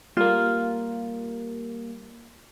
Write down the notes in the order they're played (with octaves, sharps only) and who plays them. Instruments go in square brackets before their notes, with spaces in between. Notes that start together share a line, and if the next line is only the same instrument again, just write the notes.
[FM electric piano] G3 A#3 [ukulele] F4